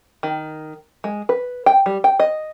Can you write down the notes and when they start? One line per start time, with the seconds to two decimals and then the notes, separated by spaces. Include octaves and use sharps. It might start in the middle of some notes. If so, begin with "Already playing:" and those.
0.23 D#3
1.04 G#3
1.29 B4
1.66 G5
1.86 G3
2.04 G5
2.20 D#5